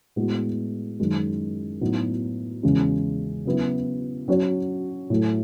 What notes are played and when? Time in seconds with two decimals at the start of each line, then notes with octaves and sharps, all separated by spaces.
0.16 A2 G#3 B3 F#4
1.00 F#2 D#3 G#3
1.81 A2 F#3 B3 D#4
2.63 E2 C#3 G#3 C#4
3.45 C#3 F#3 B3 E4 B4
4.28 F#3 C#4 F#4 C#5
5.10 A2 F#3 A3